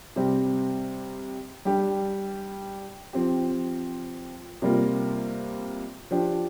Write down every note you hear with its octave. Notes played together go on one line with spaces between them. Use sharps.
C3 G3 C4 G4
G3 D4 G4
F3 C4 G4
C3 G3 A#3 F4
F3 D4 G4